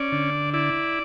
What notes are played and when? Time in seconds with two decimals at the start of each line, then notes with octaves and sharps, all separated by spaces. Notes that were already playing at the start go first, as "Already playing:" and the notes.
Already playing: C#4 D5
0.12 D3
0.54 E4 D5